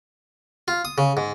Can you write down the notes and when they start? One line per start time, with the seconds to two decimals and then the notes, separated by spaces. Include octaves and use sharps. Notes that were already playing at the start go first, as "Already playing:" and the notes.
0.68 F4
0.85 D#6
0.98 C#3
1.17 G#2